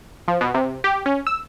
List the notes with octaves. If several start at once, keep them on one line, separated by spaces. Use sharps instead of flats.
F3
B2
C3
G4
C#4
E6